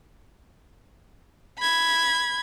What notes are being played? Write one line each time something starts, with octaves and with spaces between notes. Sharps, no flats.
B5 G#6